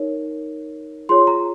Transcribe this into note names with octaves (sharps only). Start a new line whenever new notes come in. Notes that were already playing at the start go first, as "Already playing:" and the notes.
Already playing: D#4 A#4 C#5
F4 G#4 C#5 C6
A#5